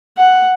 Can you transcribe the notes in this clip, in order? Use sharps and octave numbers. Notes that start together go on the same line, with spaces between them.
F#5